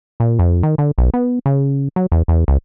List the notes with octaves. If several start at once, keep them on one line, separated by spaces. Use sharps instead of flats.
A#2
F2
D#3
D3
B1
B3
C#3
F#3
E2
E2
C#2